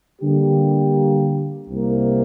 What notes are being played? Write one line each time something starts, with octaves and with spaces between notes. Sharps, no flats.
D3 G3 A#3 G4
C2 C3 A#3